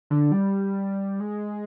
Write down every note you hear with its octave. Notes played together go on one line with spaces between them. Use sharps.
D3
G3
G#3